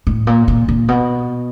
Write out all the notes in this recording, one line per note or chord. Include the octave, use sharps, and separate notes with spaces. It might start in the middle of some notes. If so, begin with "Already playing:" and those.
A2
A#2
A#2
A#2
B2